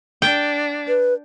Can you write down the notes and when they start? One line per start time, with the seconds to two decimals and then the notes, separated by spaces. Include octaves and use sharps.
0.22 D4 G5
0.88 B4